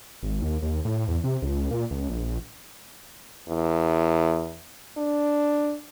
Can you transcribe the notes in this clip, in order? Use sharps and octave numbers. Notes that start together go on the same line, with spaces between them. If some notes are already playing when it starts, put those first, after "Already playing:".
G#1
D#2
D#2
A2
E2
C3
C#2
A#2
C#2
A#1
E2
D4